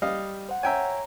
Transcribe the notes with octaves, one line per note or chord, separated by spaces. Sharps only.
G3 D#5 F5
C5 F#5
C#5 E5 G5 G#5 A#5